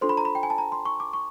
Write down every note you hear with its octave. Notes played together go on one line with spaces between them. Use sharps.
D4 F4 A4 C5 C6
B5
A#5
B5
G5
G#5
A5
A#5
C6
C#6
D6
C#6